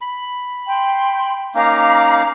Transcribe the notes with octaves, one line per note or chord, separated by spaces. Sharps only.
B5
G5 C6
A#3 C#4 D#4 F5 A#5 D6